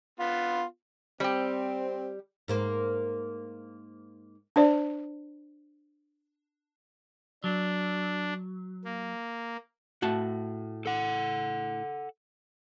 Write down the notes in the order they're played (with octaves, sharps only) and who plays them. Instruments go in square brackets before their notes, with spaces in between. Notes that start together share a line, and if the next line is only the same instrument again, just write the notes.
[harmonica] B3 F4
[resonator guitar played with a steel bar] G3 G4 [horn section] C4
[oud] G#2 A#3 C5
[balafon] D4 C5 D5
[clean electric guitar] F#3 [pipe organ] D4
[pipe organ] A#3
[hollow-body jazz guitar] A2 F#4 A5
[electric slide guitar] A4 F#5